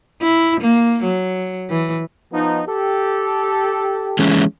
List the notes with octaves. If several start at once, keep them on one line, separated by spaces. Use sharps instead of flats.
E4
A#3
F#3
E3
F3 B3 D#4
G4 A4
E3 G#3 C#4